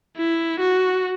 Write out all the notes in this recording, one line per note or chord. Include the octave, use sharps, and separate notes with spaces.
E4
F#4